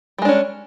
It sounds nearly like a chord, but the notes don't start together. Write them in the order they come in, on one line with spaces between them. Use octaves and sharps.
G3 G#3 D4 C#4